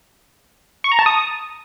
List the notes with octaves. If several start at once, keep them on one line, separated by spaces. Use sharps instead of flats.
C#6
A#5
A5
D#6